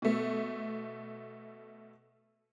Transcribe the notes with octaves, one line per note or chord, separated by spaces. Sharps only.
B2 A3